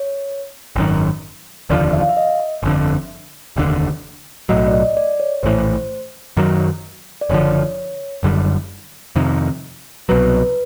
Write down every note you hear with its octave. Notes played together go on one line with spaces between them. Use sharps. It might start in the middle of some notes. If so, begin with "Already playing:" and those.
Already playing: C#5
G#1 F#2 D#3
F1 D#2 D3 F3 D5
E5
F5
E5
D#5
E5
G1 F2 D3
F1 D#2 D3
B1 A2 F#3 D#5
D5
D#5
D5
C#5
A#1 A2 E3 C5
F#2 D#3 F#3
D5
F#1 F#2 D3 F3 C#5
F#1 F#2 D3 G3
F2 C3 D#3
C2 B2 F#3 B4